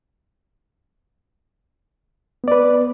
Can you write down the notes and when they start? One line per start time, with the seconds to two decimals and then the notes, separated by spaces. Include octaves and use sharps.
2.44 B3
2.48 D5
2.52 B4